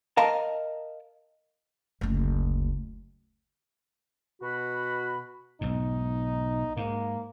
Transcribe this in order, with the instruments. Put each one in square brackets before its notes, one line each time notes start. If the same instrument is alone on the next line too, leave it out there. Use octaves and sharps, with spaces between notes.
[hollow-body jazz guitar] A#4 D#5 F5 A5 A#5
[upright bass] F#1 D2
[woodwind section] B2 F#4 B5
[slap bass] B1 G#2 [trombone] D#4
[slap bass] G#2 [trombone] A#3